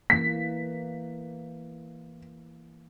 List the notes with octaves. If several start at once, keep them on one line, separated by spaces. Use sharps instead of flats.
E3 A#3 B6